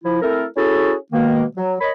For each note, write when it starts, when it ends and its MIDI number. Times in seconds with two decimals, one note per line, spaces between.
0.04 0.18 53
0.04 0.18 64
0.22 0.45 57
0.22 0.45 60
0.22 0.45 64
0.22 0.45 69
0.22 0.45 70
0.56 0.94 61
0.56 0.94 64
0.56 0.94 66
0.56 0.94 68
0.56 0.94 69
1.13 1.44 47
1.13 1.44 51
1.13 1.44 56
1.13 1.44 58
1.57 1.75 54
1.81 1.90 70
1.81 1.90 73
1.81 1.90 75
1.81 1.90 83